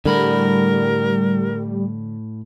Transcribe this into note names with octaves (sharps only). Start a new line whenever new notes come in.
A2 D3 G3 A#4 B5